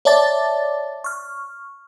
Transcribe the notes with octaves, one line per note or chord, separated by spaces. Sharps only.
C#5 D5 E5 A5 D6 A6
C#6 F6